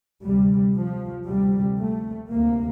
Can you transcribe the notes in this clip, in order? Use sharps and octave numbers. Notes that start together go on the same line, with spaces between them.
D2 C3 G3
F3
D2 C3 G3
A3
D2 C3 A#3